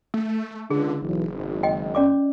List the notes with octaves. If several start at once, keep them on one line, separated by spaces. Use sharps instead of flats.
A3
C#2 D3 D4 G#4
F#1 B1 E3
G#1
D#5 G5
C#4 D5 D6